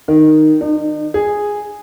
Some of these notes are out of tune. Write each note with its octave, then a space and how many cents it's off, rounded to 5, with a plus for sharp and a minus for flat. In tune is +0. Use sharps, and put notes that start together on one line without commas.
D#3 -5
D#4 -45
G#4 -5